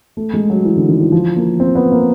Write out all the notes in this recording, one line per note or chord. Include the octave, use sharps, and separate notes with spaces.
A3
G#3
F#3
E3
D3
D#3
E3
F3
A#3
C4
B3
A#3